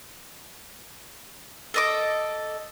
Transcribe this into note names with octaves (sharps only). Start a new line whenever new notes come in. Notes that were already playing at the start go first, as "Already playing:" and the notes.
A4 D#5 D6